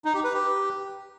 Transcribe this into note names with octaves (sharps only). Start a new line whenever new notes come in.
D#4
G4
B4
G4